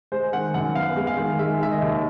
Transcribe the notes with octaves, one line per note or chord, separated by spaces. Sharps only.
G#3 C5
D#3 F#5
F#2 F#5
B3 F5
G#3
F5
D#3
G#3 E5
D#3 E5
D#5
D#2